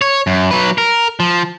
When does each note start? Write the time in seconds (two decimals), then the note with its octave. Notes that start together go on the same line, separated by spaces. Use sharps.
0.01 C#5
0.27 F#2
0.51 F#3 B4
0.78 A#4
1.20 F3